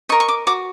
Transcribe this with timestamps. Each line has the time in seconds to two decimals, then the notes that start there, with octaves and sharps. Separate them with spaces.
0.09 A#4 D#5 C#6
0.20 C#6
0.28 D6
0.47 F#4 D6